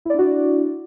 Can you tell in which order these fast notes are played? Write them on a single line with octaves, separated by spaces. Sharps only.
E4 D5 D4 F#4